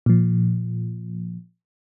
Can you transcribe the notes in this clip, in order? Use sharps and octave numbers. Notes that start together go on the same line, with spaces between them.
A#2 F3